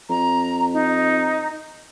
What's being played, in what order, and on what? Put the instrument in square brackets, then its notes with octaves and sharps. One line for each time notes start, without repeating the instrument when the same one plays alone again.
[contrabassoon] F2 [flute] A#5
[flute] D#4